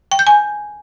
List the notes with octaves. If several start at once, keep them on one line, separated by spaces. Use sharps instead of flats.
G5
G6
G#5